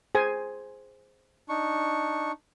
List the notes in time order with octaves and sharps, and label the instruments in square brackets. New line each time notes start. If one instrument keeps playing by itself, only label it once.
[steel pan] G#4 C5 G#5
[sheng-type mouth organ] D4 D#4 C#6